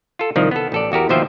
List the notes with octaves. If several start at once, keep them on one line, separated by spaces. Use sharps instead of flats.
F4 A4
C2 D#3 F3
B3 A4
A1 A4 D5
E2 F#4 G4 A#4
D#2 B2 F3 C5 E5 G5